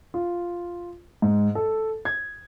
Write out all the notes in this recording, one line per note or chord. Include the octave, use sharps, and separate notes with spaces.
F4
G#2
A4
G#6